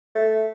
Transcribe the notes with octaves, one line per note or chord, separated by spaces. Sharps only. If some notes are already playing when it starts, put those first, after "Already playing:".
A3